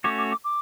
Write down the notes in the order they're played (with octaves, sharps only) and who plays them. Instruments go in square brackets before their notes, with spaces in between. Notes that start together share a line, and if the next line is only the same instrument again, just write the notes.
[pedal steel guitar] A3 C#4 F#4 C#5 [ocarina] D6
[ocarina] D6
D6
D6